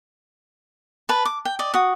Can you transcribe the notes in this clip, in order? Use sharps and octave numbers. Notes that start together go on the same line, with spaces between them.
B4 A5
D6
G5
D5 D#5
F#4 D#6